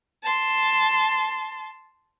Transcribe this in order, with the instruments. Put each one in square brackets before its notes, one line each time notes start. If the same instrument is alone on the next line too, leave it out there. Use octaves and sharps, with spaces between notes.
[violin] A5 C6